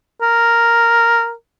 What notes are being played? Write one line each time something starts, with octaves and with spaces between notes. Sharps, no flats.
A#4